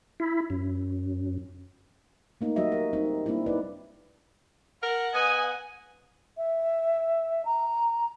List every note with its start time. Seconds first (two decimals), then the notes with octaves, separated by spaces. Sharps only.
0.20 E4
0.50 F#2
2.41 A3 A#3 D#4
2.56 F#3 G3 F#4 D#5 E5
2.72 A#4
2.93 G3 C4 D#4
3.26 G3 A#3 C4 D4 E4
3.46 D#4 E4 B4 D5
4.83 A#4 F#5
5.14 B3 D#5 G#5
6.38 E5
7.45 A#5